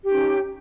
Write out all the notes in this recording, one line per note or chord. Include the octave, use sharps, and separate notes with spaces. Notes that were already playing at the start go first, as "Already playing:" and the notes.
C#4 D#4 G4